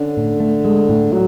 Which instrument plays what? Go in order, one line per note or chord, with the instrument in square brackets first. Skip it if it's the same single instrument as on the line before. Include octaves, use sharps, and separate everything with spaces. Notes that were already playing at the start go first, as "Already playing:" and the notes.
Already playing: [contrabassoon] D3 [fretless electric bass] C#4
[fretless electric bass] A2
A3
G#3
A2
[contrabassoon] F#3